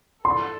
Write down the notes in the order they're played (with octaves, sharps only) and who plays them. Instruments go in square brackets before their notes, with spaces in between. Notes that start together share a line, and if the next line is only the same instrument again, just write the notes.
[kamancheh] A4 [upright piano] C6